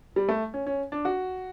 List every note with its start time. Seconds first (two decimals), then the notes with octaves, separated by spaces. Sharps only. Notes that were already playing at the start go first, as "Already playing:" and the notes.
0.16 G3
0.29 A3
0.54 C#4
0.67 C#4
0.92 D4
1.05 F#4